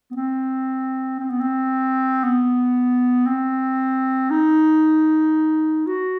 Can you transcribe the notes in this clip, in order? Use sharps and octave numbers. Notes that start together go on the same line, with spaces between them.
B3
C4
C4
B3
C4
B3
C4
D#4
F#4